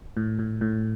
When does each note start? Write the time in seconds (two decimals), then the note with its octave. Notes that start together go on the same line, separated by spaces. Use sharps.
0.17 A2
0.39 A2
0.61 A2